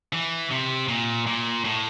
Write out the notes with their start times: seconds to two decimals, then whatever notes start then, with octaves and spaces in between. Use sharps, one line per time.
0.13 E3
0.51 C3
0.88 A#2
1.27 A#2
1.65 A2